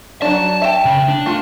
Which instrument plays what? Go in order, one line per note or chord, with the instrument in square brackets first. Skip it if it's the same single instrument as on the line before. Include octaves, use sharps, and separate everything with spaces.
[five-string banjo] F#3 D4 [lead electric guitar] A5
[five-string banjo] E5 G5
[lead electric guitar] C#3
D4
[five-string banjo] A3 F4